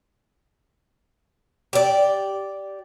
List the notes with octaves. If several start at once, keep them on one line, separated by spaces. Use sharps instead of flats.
G4 D5